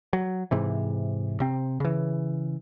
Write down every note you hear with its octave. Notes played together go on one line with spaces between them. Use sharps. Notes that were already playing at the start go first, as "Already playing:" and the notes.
F#3
G#2 C3 E3
C3 C4
C#3 E3